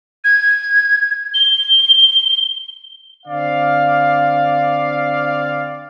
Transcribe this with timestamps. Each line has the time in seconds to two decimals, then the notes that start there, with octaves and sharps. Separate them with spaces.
0.24 G#6
1.34 G7
3.26 D3 C4 D5 F5